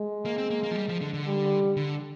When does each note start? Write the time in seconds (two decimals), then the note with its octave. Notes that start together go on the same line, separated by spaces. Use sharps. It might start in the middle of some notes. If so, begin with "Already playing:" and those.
Already playing: G#3
0.25 A#3
0.38 C4
0.50 A#3
0.63 A#3
0.71 F3
0.76 G3
0.88 F3
1.01 D3
1.14 D3
1.26 G3
1.77 D3